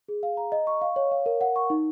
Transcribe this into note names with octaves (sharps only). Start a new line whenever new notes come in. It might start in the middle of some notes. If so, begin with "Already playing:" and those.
G#4
F5
A#5
D#5
C#6
F5
C#5
F5
A#4
F#5
C#6
D#4